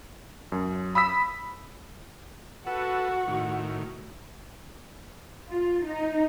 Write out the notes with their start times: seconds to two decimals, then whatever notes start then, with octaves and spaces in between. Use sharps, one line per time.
0.52 F#2
0.95 B5 D#6 E6 B6
2.66 F#4 A4 B4 F#5
3.28 A2 D#3
5.47 F4
5.83 D#4